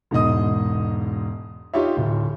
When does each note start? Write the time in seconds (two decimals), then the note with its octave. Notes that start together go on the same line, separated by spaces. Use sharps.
0.11 E1 G#2 B2 D#5 D#6
1.74 D#4 F4 G4 C#5 E5
1.97 D1